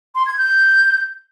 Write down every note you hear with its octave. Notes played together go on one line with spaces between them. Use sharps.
C6
G#6
G6